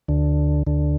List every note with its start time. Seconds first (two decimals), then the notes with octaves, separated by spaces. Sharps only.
0.08 D2 D3
0.67 D2 D3